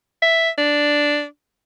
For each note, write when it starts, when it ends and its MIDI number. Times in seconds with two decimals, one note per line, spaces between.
0.22 0.50 76
0.58 1.25 62